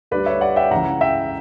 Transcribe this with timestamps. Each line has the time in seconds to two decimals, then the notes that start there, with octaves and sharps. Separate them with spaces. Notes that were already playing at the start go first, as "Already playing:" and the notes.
0.11 D2 D3 G3 B4 D5
0.26 C#5 E5
0.41 D5 F#5
0.56 E5 G5
0.71 C#2 C#3 E3 F#5 A#5
1.01 E5 G5